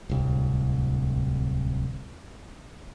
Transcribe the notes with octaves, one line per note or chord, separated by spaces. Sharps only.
D1 C2